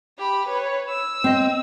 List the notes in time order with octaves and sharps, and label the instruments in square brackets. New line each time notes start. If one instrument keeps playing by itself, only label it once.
[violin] G4 B5
B4 C#5
E6
[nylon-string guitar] C4 D#5